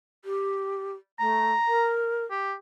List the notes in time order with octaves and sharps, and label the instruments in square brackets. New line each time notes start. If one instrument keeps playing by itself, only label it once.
[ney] G4
[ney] A3 [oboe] A#5
[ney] A#4
[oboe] G4